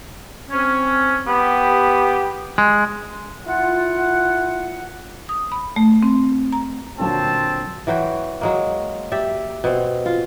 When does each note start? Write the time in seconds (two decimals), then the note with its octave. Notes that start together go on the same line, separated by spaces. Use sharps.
0.50 C4 C#4
1.27 B3 G4
2.58 G#3
3.46 E4 F4 F#5
5.29 D#6
5.52 B5
5.76 A3
6.03 C4
6.53 A#5
6.99 A#2 D3 F#3 C4 A5
7.87 E3 F#3 F#4 G5
8.41 F#3 G#3 A#3
9.12 G4 D5 E5
9.64 B2 C4
10.06 F4